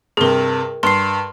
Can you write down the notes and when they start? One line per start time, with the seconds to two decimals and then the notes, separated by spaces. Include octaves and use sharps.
0.17 G2 C3 G#4 A#4
0.83 G2 C6 C7